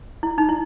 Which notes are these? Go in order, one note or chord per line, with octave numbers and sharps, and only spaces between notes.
E4
D#4
E4